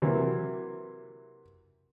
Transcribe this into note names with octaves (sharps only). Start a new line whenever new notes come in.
C3 E3 F#3 A#3